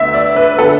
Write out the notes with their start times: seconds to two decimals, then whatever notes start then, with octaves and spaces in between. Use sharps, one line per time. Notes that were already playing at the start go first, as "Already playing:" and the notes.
Already playing: D2 D3 B3 E5
0.14 D5
0.36 B4
0.58 D3 B3 A4